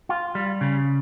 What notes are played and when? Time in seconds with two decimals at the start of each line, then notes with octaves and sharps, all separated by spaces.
0.09 F4
0.35 G3
0.61 C#3